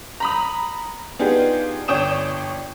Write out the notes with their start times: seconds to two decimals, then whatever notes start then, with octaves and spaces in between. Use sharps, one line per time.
0.20 A#5 B5 D#6
1.19 B3 D4 D#4 F4 G4 G#4
1.88 G1 D4 C#5 G5 D#6 E7